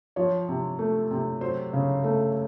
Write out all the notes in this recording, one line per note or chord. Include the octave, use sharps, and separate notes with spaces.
F3 C#5
C3
A3
C3
F#3 C5
C#3
A3